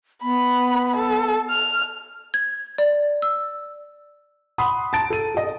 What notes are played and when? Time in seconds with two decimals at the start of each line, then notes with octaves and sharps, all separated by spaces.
0.22 B3 B5
0.96 A4
1.50 F6
2.34 G#6
2.78 D5
3.22 E6
4.58 F#5 B5 C6 D#6
4.93 A5 A#5 A6 D7
5.10 A4 D#7
5.35 A4 D#5